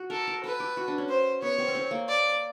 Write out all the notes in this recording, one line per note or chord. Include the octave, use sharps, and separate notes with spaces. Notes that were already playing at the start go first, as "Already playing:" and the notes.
Already playing: F#4
A4 A#4
A#4
A4 B4
G4
F#4
D4
C#4
C5
B3 C#5
C4
C#4
C4
A#3
D5